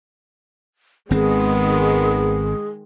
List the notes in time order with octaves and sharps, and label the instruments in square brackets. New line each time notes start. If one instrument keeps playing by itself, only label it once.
[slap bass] G#1 C4 [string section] D#3 G#3 [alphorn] B3 [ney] G#4